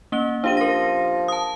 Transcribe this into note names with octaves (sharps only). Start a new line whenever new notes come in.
A#3 C#4 G7
F3 D4 G4 D#7
A#4 A#6
A5 D#6